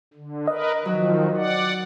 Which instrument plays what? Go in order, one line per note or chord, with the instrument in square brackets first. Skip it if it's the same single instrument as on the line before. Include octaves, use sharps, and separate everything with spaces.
[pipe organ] D3
[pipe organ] A#4 B4 [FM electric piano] D#5
[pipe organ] D#3 F3 [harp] F#3 F#4
[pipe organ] D5 F#5